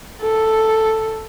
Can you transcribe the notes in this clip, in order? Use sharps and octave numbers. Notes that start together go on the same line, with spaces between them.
A4